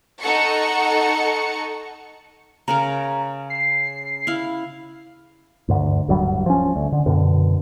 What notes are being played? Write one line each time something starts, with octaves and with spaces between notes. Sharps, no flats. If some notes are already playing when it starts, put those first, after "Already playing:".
D#4 A4 F#5 C#6 C#7
C#3 C#4 A#4 A#5
C7
E4 F5
D2 G2 D3
D1 G2 F#3 G3
F3 C#4
D2
D3
F#2 B2 D3